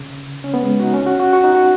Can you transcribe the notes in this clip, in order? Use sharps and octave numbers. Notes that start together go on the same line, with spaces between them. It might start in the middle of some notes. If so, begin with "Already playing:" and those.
Already playing: C#3
C#4
B3
G#3
F#4
D#4
C#4
F#4
F#4
F#4
D#4
F#4